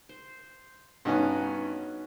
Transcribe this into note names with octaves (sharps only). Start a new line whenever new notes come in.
C5
G2 B3 C#4 D#4 F#4